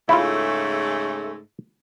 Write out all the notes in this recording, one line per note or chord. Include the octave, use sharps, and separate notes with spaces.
G#2 C#3 A3 E4 F4